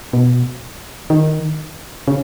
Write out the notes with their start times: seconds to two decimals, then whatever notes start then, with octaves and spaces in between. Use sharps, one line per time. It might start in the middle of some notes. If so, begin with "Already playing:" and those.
0.13 B2
1.10 D#3
2.08 C#3